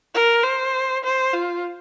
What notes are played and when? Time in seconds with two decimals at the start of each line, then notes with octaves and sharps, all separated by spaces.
0.14 A#4
0.44 C5
1.04 C5
1.33 F4